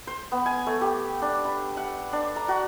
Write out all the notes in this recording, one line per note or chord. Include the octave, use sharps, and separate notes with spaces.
C5
B3
G#5
A3
G4
D4
B5
F#5
D4
A#5
F#4